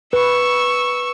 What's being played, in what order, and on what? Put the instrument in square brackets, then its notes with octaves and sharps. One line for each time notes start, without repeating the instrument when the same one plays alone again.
[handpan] B4 [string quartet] C#6 E6